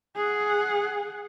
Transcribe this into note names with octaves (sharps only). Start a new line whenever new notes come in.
G#4 F#5